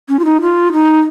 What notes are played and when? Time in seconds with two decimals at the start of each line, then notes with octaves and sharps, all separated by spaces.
0.09 C#4
0.19 F4
0.25 D#4
0.41 F4
0.73 D#4